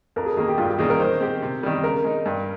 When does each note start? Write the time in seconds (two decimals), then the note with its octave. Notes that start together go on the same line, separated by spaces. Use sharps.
0.16 F2 A#4
0.26 G#4
0.37 D#3 A#3 G#4
0.48 G4
0.58 G2 F4
0.68 G4
0.79 D#3 G3 A#3 C#4 G#4
0.90 A#4
0.99 D#3 C5
1.21 G#3 C4 G4
1.42 C3
1.63 D#3 G3
1.84 C#3 A#4
2.04 G#3 D#4
2.26 G2